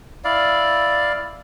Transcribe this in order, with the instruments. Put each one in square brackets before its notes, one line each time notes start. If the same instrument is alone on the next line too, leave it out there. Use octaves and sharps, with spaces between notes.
[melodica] E4 D5 F5